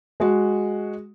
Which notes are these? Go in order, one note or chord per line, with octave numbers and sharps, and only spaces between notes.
G#3 F#4